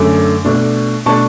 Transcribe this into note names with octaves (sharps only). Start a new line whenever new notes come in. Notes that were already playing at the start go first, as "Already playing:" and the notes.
Already playing: F#2 D3 A3 D6
B2 A3 D4
B2 A3 D4 A5 C#6